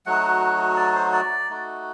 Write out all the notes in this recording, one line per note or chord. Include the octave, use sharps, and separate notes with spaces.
F#3 A3 D#4 F#4 F#5
D5
C5
D5
A3 D#4 F#4